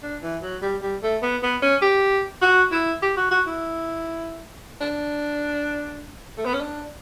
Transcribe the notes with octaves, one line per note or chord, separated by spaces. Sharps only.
D4
E3
F#3
G3
G3
A3
B3
B3
C#4
G4
F#4
E4
G4
F#4
F#4
E4
D4
A3
B3
C#4
D4